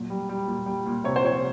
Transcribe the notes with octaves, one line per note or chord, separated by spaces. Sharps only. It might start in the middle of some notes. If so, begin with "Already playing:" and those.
Already playing: A#2 F#3
G3
G3
A#2
G3
A#2
C3 C#5
C5
F3 C#5